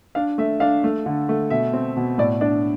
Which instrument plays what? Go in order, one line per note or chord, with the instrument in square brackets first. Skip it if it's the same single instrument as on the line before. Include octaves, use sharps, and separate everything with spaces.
[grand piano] D4 F5
A3 E5
D4 F5
A3
D3
A3
B2 E5
C4
B2
A2 D5
D4 D5